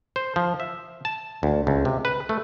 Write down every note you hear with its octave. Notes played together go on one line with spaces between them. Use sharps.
C5
F3
E5
A5
D2
C#2
C3
B4
A3